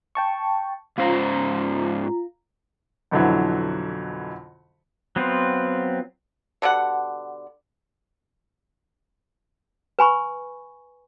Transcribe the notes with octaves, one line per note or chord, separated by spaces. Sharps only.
G5 A5 C#6
G#2 C#4 F4 C5 A#5
B1 F2 D3 E3 F#3 E4
F#3 B3 C4 F4
B2 D3 G3 F#5
B4 G#5 B5 C#6